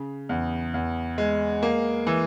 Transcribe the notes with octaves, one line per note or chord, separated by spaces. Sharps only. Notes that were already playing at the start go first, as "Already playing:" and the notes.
Already playing: C#3
E2
E2
G#3
A#3
E3